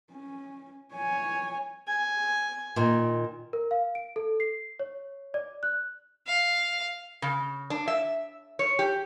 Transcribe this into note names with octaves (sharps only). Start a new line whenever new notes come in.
C#4
C#5 G#5
G#5
A#2 D#3
A#4
F5
D7
A4
C7
C#5
D5
F#6
F5
C#3
D4
E5
C#5
G4